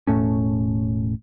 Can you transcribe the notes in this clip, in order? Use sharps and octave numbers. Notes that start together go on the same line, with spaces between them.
E1 A2 A3 C#4